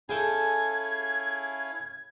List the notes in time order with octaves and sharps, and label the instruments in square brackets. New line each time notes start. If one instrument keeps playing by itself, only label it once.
[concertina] C#4 E4 F5 [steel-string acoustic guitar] G#4 [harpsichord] A4 G5 G#5 [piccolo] G#6